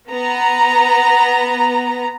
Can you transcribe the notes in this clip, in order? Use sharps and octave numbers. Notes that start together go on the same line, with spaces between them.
B3 A#5